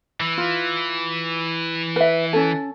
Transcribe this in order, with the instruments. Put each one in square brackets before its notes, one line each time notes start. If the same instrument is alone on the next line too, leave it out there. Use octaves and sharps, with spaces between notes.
[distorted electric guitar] E3
[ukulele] F4
B4 E5
C#4 A4